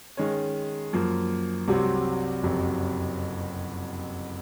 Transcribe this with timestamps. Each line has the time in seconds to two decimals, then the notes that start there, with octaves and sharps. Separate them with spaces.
0.17 D#3 G#3 C#4
0.93 F#2 F3 A#3
1.68 C2 C3 F#3 C4
2.43 F#1 F2 C3 F#3